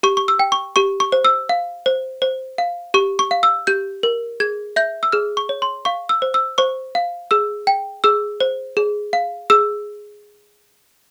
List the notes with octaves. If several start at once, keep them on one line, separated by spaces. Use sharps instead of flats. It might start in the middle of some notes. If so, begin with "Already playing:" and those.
G4 C#6
C#6
E6
G5
C#6
G4 C#6
C#6
C5
E6
F5
C5
C5
F5
G4 C#6
C#6
F5
E6
G4 G6
A#4
G#4 G#6
E5 G6
E6
G#4 F6
C#6
C#5
C6
F5 C#6
E6
C5
E6
C5 C#6
F5
G#4 E6
G5
G#4 E6
C5
G#4
F5
G#4 E6